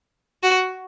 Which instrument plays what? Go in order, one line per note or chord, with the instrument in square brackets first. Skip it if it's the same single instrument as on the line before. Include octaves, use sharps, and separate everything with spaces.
[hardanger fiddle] F#4